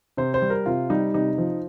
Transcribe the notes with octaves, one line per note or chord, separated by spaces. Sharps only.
C3 C5
C5
G3
A#4
C3 F4
G3 D#4
C3 D#4
F3